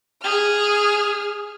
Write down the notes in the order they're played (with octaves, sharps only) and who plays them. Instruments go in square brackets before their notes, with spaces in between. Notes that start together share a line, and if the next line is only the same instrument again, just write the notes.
[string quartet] G#4 F6